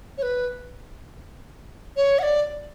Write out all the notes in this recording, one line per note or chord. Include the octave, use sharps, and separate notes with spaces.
C#5
B4
C#5
F#5
D5